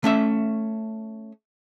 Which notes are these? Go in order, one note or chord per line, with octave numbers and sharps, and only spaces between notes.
A3 C#4 E5